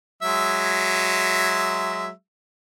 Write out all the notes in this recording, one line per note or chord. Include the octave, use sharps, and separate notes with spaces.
F#3 G#3 E5